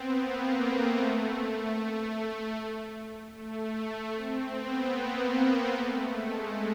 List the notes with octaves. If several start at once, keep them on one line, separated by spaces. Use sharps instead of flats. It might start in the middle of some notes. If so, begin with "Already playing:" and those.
Already playing: B3 C4
A#3
A3
A3
C4
B3
A#3
A3
G#3